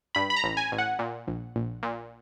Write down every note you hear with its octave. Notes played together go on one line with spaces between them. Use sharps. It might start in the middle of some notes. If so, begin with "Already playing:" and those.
G2 B5
B5
A#5
A1
G#5
A1
F#5
A#2
A#1
A#1
A#2